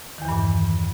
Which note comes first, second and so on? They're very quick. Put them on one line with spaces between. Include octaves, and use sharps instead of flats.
D#3 E2 E3 G2 A#2